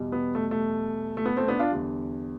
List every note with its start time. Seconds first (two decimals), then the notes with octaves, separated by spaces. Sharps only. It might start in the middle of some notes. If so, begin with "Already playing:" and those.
Already playing: E2 B2 G3
0.12 B3
0.35 A3
0.51 A3
1.17 A3
1.25 B3
1.37 A3 C4
1.48 B3 D4
1.59 D4 F4
1.71 E2 D3 G3